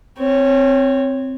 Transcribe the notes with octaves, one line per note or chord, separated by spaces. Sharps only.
C4 C#5